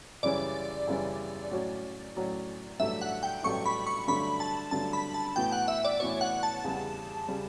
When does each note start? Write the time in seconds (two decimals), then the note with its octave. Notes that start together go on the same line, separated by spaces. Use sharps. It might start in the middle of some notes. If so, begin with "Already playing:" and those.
0.23 F#2 C#3 E3 G3 C#4 D5
0.87 F#2 C#3 E3 G3 C#4
1.51 A2 F#3 C#4 F#4
2.16 A2 F#3 C#4 F#4
2.80 A1 G2 F#3 A3 D4 E5
3.01 F#5
3.23 G5
3.43 A1 G2 F#3 A3 D4 C#6
3.66 B5
3.87 C#6
4.08 G2 D3 F#3 A3 D4 B5
4.40 A5
4.71 G2 D3 F#3 A3 D4 A5
4.93 B5
5.14 A5
5.36 A2 E3 B3 F#4 G5
5.52 F#5
5.68 E5
5.85 D5
6.00 A2 E3 B3 F#4 C#5
6.21 F#5
6.43 A5
6.64 E2 C#3 G3
7.28 C#3 G3